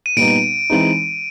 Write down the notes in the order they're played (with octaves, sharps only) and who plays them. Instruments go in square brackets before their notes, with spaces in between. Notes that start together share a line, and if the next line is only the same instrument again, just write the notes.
[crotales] D#7
[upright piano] A#2 G3 B3 D#4 [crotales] D7
[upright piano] E3 G#3 C4 D#4